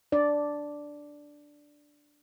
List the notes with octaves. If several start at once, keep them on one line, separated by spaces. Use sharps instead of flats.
D4 D5